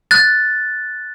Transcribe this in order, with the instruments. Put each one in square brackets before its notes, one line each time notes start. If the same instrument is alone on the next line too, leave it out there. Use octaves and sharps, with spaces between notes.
[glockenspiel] F#6 A6